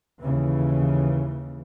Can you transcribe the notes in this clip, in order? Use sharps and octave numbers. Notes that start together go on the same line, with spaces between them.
D#2 C#3 E3